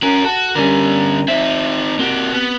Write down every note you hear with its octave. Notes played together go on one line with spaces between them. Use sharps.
C#4 F#4 A#4
F#4 A4
D3 G3 C#4 A#4
C4 D#4 E5
A#3 C4 F#4 G4
B3